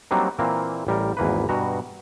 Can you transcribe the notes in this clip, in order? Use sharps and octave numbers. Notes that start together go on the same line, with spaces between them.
F#3 G3 A#3 C4 D4 D#4
A#2 E3 A#3 C4 F5
A1 G3 A#4
G#1 E2 A#3 B4
G2 B2 F#4 A#5